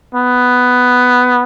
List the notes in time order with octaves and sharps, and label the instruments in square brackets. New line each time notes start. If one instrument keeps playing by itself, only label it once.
[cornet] B3